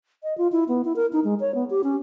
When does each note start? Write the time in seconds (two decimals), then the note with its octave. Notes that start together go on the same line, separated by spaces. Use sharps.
0.23 D#5
0.38 F4
0.52 E4
0.68 B3
0.85 E4
0.96 A#4
1.13 D#4
1.24 G#3
1.40 C#5
1.55 B3
1.70 G4
1.84 C#4